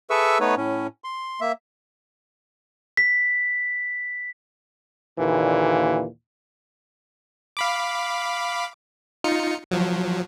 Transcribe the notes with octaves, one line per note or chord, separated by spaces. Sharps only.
G#4 A4 B4 E5 C#6 E6
A3 B3 D#4 B4 C#5
A2 C#4
C6
A#3 E5
B6
D#2 A#2 D3 E3
F5 B5 D6
D#4 F4 C#7
F3 F#3